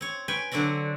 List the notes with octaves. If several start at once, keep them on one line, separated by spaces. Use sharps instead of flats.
C4 C#5
B4 C#5 G5 G#5
D3 F#3 C4 D4 F#4